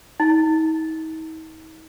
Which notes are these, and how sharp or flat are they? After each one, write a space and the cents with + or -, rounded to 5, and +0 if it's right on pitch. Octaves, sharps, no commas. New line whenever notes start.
D#4 +40